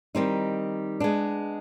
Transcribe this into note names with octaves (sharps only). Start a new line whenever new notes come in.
D#3 G3 C4 D#4
G#3 B3 D4